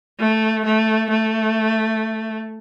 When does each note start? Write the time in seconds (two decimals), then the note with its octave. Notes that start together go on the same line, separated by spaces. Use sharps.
0.19 A3
0.65 A3
1.10 A3